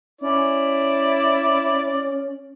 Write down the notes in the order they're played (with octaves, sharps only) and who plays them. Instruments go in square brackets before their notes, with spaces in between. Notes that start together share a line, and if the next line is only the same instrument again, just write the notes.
[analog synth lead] C#4 [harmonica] E4 D5